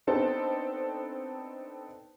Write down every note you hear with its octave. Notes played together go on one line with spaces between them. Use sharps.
B3 C4 D4 D#4 A4 C5